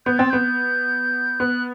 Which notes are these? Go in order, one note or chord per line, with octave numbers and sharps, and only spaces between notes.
B3 G6
C4 A6
B3 G6
B3 F#6